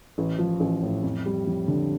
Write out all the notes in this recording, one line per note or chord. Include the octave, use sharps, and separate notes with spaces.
A1
F3
A1
A2
F2
G3
F2
D3